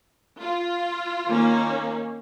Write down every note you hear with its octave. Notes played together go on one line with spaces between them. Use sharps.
F4
D#3 A#3 C#4